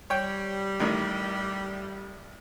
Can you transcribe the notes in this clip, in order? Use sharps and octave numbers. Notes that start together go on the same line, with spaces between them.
G3 C#5 G5
A1 A2 D#3